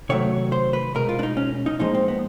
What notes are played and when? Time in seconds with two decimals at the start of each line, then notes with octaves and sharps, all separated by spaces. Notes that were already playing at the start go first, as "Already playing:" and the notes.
0.09 C3 D#3 F#3 A3 C#5
0.52 C5
0.73 B4
0.95 B2 G#3 A#4
1.09 F4
1.19 D4
1.23 D#4
1.37 C#4
1.66 D#4
1.79 A#2 F3 G#3 D#4
1.95 C4
2.08 B3